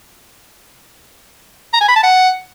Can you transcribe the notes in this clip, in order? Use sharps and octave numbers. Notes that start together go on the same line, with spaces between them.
A#5
G#5
B5
A5
F#5